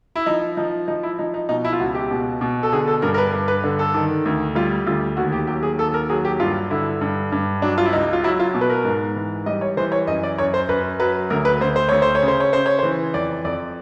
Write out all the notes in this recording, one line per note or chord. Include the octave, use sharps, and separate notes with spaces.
E4
F3 D#4
F3 D#4
F3 D#4
E4
F3 D#4
D#4
B2 D#4
E4
F4
C#2 F#4
G4
B2
B2
A4
D3 G#4
A4
G2 A#4
A#4
B4
G2
B4
D3
A4
D#3
D2
G3 F4
D2 F4
D#2 F#4
G4
F#3 G4
G#4
D#2 A4
A4
A#4
F#3 G#4
G4
G2 F4
D3 E4
G2
G2
F#3 D4
F4
E4
C#2 D#4
F4
F#3 E4
F4
B2
B4
A#4
G#2
E3
G3 D#5
C#5
E3 C5
C#5
F#2 D#5
D5
F#2 C#5
C5
F#2 B4
F#3 B4
D2 A#4
B4
D2 C5
C5
D2 C#5
C5
C#5
C#3
C5
C#5
C#3 C5
C#5
E3 C5
F2 D5
F2 D5